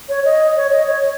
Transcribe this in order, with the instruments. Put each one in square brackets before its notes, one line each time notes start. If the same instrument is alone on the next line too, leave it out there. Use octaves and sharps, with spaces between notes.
[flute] C#5
D#5
C#5
D#5
C#5